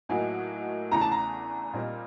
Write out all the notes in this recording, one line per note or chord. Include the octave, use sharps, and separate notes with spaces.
A2 F#3 A#3 D#4 F#4 G#5
E2 C#3 E3 A3 D4 A#5
A5
A#5
A#2 G3 C4 D#4